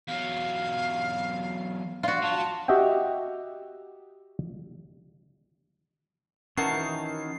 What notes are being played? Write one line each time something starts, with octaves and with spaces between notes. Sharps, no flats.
E2 F#3 F5
F4 F#4 D5
F#3 A5
F#4 G4 D#5 E5 F#5 G5
D#3 E3 C#4 F#4 A#4 A5 C7